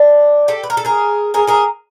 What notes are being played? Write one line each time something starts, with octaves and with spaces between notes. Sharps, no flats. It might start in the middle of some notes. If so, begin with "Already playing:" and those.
Already playing: D4
G4 A4
B4
A#4
A4
G#4 A#4
G#4 A#4
G#4 A#4